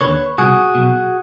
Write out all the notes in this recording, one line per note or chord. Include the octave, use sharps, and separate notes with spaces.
D#2 D3 B4 C#5
C2 B2 F#4 G#4
B1 B2